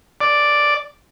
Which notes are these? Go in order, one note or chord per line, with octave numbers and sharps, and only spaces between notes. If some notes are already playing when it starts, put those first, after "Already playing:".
D5